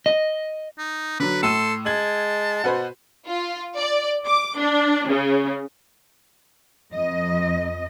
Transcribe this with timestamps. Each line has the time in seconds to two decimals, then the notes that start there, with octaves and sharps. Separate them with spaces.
0.06 D#5
0.78 D#4
1.20 D3 F#3 B4
1.43 A2 A4 C6 E6 D#7
1.86 G#3 A5 G#6 F#7
2.64 B2 F#4 B4 C5
3.26 F4
3.77 D5
4.26 D6
4.59 D4
5.07 C#3
6.93 F2 D#5